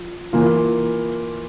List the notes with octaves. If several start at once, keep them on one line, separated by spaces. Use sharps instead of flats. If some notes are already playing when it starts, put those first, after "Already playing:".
Already playing: F3
E3 A#3 F4